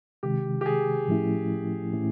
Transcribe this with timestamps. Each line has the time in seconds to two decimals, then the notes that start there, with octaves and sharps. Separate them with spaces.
0.23 C3 D#3 G#3 G4
0.61 G4
0.66 G#4
1.08 A2 F3 A3 C#4 E4
1.93 A2 E3 A3 C#4 E4